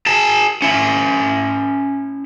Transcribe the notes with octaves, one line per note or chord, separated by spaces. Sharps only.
G#4 A5
C#4 E4